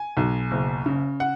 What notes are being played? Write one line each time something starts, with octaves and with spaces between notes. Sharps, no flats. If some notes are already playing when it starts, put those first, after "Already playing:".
Already playing: G#5
B1
F#1
C#3
F#5